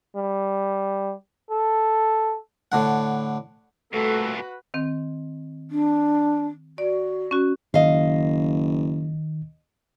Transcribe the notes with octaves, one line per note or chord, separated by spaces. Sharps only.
G3
A4
A2 D3 F#5
C2 A#2 A3 F#4 A4 B4
D#3 C4
D4
F#4 D5
C#4 F#4
F#1 D#3 D#5 F5